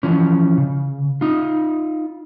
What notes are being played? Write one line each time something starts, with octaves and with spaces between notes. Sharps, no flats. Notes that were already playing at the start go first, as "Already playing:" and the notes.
E3 F3 C#4
C#3
D#4 F4